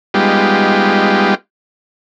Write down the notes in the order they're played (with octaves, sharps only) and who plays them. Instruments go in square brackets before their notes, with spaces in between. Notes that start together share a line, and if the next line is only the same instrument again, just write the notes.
[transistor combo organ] G3 G#3 B3 D#4 F4 G4